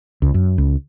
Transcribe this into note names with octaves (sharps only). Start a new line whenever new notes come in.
C#2
F#2
C#2